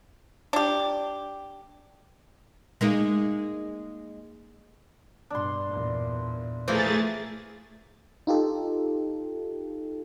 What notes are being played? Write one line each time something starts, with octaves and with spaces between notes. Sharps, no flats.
D4 G4
G#3 A#3 D#4
G2 B2 D4 C6
E2 A#2
E3 F3 A3 A#3 G#4 E5 A6
D#4 F4 G4 A4